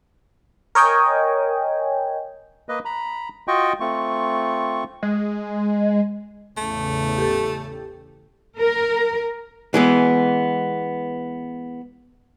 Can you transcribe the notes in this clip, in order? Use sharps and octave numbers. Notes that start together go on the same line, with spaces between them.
A#4 C#5 D#5 G5 G#5
A#3 B4 D#5
A#5 B5
F4 F#4 D#5 G5 C#6
A3 C4 F4 C#6
G#3
A1 E2 C#3 A3
G4 A4
A#4
E3 G#3 B3